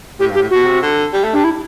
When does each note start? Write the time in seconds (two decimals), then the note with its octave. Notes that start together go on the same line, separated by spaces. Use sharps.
0.20 A2 G4
0.30 G2
0.35 G4
0.40 A2
0.50 B2 F#4
0.66 C3
0.82 D3
1.13 G3
1.24 A3
1.33 G3 D4
1.44 E4